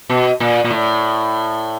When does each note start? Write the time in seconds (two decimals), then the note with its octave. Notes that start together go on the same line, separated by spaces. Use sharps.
0.09 B2
0.40 A#2
0.64 A#2
0.71 A2